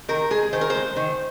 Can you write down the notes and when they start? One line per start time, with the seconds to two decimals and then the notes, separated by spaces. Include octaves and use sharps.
0.08 D#3 A#4
0.31 G#3 G#4
0.53 D#3 C5
0.61 A#4
0.70 G#3 C5
0.96 D#3